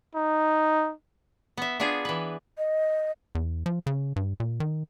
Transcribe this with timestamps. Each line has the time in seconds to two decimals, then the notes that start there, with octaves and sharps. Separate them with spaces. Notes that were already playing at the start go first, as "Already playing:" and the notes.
0.15 D#4
1.57 B3 E5
1.80 B3 D4 F4 G#4
2.05 E3 B4
2.58 D#5
3.35 E2
3.66 F3
3.87 C#3
4.16 G2
4.40 A#2
4.60 D#3